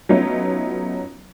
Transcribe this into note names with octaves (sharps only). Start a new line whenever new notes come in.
F#3 A3 B3 C#4 D#4 F4